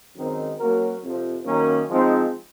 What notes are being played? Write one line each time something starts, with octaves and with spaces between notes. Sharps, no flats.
F#2 D#3 G#3 C4 D#4
F#3 A#3 C#4 F#4 A#4
F2 C3 F3
F#2 D#3 A#3 C#4
F3 G#3 C4 D#4